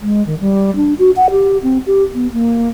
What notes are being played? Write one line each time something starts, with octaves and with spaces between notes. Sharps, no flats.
G#3
D#3
G3
D4
F#4
F#5
G4
C4
G4
B3
A#3